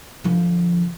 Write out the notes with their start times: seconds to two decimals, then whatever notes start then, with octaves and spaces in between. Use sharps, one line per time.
0.24 D3 F3